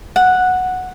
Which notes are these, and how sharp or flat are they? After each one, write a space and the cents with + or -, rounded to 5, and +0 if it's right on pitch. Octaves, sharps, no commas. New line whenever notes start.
F#5 -5